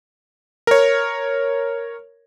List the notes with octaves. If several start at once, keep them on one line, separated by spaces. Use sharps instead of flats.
A#4 C#5